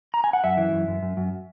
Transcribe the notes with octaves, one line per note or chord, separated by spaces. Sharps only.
A#5
G#5
F#5
F#2 E5
E3
F#2
F#2
F#2
F#2